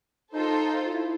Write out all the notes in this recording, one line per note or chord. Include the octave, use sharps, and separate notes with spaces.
D#4 F4 A4 C5
F4
E4